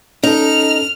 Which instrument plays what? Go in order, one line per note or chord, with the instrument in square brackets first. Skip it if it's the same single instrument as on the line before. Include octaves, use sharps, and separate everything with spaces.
[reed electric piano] C#4 A4 [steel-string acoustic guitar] D#4 [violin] F6